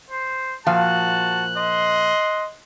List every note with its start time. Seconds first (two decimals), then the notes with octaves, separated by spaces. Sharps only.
0.10 C5
0.66 A#2 F3 F#4 F5 A5 F#6
1.56 D#5 C6